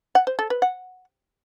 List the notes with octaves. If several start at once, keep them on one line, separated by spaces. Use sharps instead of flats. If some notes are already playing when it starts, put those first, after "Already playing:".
F#5
C5
A4
B4
F#5